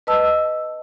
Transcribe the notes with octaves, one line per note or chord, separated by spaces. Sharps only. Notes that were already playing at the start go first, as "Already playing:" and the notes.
B4 D#5 A5 E6